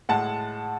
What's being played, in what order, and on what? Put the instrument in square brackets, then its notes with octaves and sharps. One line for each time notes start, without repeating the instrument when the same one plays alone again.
[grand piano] A2 G#3 F#5 A5